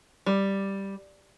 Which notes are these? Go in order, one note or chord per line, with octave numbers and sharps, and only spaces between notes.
G3